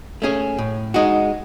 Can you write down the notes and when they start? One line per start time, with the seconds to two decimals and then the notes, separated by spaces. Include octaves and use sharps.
0.22 A3 C#4 G#4
0.58 A2
0.94 G#3 D#4 F#4